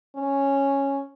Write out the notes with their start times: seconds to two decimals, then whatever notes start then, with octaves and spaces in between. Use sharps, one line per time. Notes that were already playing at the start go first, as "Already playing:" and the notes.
0.15 C#4